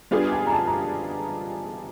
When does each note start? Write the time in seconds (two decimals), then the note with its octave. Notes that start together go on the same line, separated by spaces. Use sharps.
0.11 G3 B3 D4 F4 G#4
0.32 G#5
0.47 A#5
0.52 A5
0.67 A#5